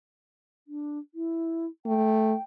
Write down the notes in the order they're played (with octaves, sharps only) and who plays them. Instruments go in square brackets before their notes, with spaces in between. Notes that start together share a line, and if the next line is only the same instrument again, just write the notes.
[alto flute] D4
E4
[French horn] A3 [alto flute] G5